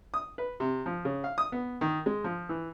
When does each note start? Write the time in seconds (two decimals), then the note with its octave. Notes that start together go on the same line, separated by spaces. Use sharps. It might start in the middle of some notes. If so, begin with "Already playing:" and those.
0.14 D#6
0.38 B4
0.60 C3
0.86 F3
1.05 C#3
1.24 F5
1.38 D#6
1.52 B3
1.81 D#3
2.06 G#3
2.24 F3
2.49 E3